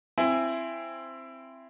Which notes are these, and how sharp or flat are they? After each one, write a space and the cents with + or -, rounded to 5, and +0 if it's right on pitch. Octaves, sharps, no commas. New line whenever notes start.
C4 +0 E4 +20 G#5 +0